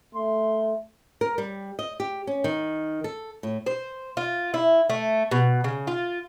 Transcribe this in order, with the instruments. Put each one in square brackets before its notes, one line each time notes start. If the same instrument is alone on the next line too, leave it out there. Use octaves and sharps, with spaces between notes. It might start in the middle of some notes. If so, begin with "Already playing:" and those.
[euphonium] A3 [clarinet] C6
[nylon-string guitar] A#4
G3
D#5
G4
C#4
D#3
A4
A2
[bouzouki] C5
F4
E4
A3
B2
C#3
F4